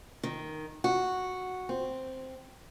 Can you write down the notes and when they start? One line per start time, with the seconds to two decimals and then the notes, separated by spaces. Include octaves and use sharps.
0.23 D#3
0.84 F#4
1.69 C4